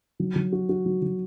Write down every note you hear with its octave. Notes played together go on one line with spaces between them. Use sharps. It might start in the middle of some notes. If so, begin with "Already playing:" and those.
F#3
F#3
F#4
F#4
F#3
F#3